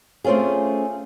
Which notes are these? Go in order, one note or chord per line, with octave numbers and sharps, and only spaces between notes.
A3 C4 C#4 F4 G#4